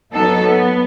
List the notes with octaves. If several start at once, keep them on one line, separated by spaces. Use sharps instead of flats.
F#3 B3 D#4 A4
B3